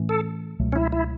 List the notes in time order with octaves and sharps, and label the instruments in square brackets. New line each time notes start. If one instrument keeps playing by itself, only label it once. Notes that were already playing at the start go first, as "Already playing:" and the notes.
Already playing: [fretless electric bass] A2 E3 A3 C#4
[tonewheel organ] A4
[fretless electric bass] C#2 B2 F#3 A3
[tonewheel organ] C#4
E4
E4